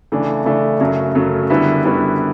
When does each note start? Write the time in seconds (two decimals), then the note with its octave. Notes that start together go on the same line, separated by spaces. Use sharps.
0.12 C#3 E3 A3 D4
0.45 C#3 E3 A3 D4
0.80 F#2 C#3 F#3 A3
1.15 F#2 C#3 F#3 A3
1.50 F#2 D3 G3 B3 E4
1.84 F#2 D3 G3 B3 E4